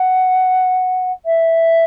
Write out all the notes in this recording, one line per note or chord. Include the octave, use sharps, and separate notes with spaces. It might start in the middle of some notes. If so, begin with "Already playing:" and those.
Already playing: F#5
E5